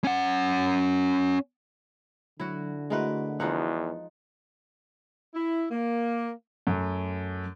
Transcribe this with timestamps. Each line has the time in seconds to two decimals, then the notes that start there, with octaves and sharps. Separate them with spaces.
0.04 C#4 F#5
2.40 D3 F#3 E4 F#4
2.90 G#3 A3 E4 F#4 A#4 B4
3.40 E2 F3 D#4 F#5
5.34 E4
5.71 A#3
6.67 F#2 F#3 A3